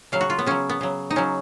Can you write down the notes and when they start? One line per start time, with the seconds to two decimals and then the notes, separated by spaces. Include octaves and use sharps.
0.12 C#3 F#3 F5
0.21 F#4
0.30 F4
0.39 B3
0.46 C#3 F#3 C#4
0.69 B3
0.81 C#3 F#3
1.10 D#4
1.16 C#3 F#3 C#4